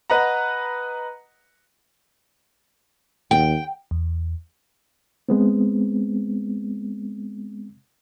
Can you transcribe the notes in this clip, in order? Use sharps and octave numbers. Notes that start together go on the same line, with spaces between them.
B4 D#5 F#5 A#5
D#2 G5
E2
G#3 B3 C4